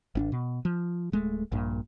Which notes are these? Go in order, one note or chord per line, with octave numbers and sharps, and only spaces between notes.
G#1 C#4 D4
B2
F3
D1 G#3 A3
A#1 G2 A#2